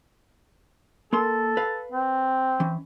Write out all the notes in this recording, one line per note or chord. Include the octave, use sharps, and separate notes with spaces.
A#3 A4 A#4 C6
B4 F5
C4
E3 C#4